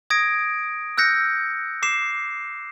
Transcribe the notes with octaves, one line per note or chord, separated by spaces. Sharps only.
D#6 G#6 A#6 D7
E6 F#6 G6 A#6 C#7
D6 C7 E7